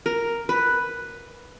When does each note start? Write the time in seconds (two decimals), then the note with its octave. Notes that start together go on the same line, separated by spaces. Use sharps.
0.06 A#4
0.49 B4